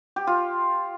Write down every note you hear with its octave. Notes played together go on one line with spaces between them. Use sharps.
G4
F4